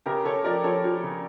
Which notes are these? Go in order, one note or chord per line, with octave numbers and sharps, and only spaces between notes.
C#3 G4 A#4
C#3 A4 C#5
F3 A#4 D5
F3 A4 C#5
F3
C#3